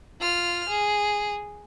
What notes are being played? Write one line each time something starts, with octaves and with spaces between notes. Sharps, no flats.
F4 F6
G#4